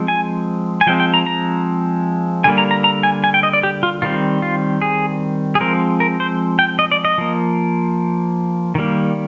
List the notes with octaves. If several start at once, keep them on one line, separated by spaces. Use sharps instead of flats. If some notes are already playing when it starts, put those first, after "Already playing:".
Already playing: F3 G#3 C4
G#5
G#5
F3 G#3 C4 G5
G5
A#5
A#5
D3 G3 A#3 G#5
A#5
A#5
A#5
G#5
G#5
G5
D#5
D5
G4
F4
D#3 G3 C4 F4
F4
G#4
G#4
F3 G#3 C4 A#4
A#4
C5
G5
D#5
D5
D#5
F3 A#3
D#3 G3 A#3